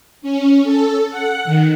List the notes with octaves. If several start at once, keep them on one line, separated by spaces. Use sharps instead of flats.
C#4
A4
F#5
D#3